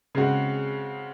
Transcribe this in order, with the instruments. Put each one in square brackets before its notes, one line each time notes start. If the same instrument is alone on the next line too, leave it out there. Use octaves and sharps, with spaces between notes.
[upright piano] C#3 G#3 C4 F#4